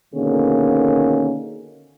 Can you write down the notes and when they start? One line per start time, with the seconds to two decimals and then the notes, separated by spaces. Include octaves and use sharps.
0.14 B2 D3 D#3 A#3 C#4 G#4